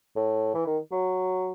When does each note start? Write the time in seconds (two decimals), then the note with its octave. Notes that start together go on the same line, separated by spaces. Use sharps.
0.16 A2
0.54 E3
0.66 D#3
0.92 F#3